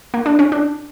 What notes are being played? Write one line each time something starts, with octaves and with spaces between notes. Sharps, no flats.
A#3
D4
C#4
D4